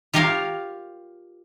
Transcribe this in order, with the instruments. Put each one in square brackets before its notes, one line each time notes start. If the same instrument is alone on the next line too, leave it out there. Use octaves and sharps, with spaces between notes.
[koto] F4 G4 A#4 C#5 F5